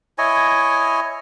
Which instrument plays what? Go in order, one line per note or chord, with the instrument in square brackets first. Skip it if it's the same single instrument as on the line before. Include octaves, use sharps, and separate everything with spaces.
[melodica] E4 C#5 D#5 G#5